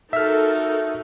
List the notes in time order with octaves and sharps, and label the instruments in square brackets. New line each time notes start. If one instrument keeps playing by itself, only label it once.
[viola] D#4 F#4 [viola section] A4 A#4 [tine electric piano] E5 F6